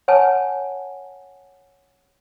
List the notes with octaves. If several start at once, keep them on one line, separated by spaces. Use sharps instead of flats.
C#5 F#5 G#5 A5